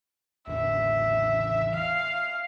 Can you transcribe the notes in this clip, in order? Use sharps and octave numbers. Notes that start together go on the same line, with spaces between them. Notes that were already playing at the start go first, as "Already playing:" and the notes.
A1 E2 D3 E5
F5